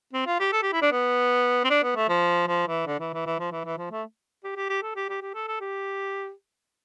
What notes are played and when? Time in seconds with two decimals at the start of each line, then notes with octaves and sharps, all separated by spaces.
0.13 C4
0.27 F4
0.40 G4
0.53 A4
0.62 G4
0.73 E4
0.82 D4
0.92 B3
1.64 C4
1.70 D4
1.83 B3
1.96 A3
2.09 F3
2.48 F3
2.68 E3
2.87 D3
3.00 E3
3.14 E3
3.26 E3
3.40 F3
3.52 E3
3.65 E3
3.78 F3
3.91 A3
4.44 G4
4.56 G4
4.69 G4
4.83 A4
4.95 G4
5.09 G4
5.22 G4
5.34 A4
5.48 A4
5.60 G4